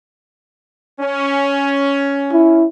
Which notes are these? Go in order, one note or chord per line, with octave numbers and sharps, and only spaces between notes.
C#4
E4